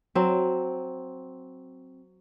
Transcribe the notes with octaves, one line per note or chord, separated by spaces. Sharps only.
F#3 C4